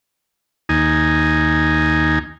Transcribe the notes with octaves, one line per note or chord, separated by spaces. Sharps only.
D#2 D#4 G#5